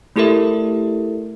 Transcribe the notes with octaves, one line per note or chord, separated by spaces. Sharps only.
A3 E4 G4 A4 A#4 E5